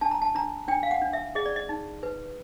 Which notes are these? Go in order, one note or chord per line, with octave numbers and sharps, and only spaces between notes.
D4 A5
A#5
A5
D4 A#5
D4 G5
F5
F#5
D4
E5
G#4 D#5
D5
D#5
D#4
B4